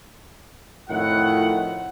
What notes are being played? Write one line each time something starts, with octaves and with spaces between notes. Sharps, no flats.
F2 A2 D#3 E4 F4 F#5